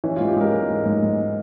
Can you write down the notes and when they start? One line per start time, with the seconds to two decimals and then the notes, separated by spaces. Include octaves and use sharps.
0.04 E3 C#4
0.16 G#2 F4
0.28 G4
0.37 G#3 A#4
0.53 G#2
0.69 G#2
0.85 G#2
1.03 G#2